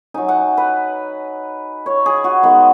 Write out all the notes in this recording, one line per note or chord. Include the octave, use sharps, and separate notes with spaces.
F#3 D#4 G#5
F#5
B4
C#5
G#4
F#4
D#3 G#3 B3